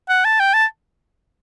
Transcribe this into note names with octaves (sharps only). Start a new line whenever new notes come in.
F#5
A5
G5
A5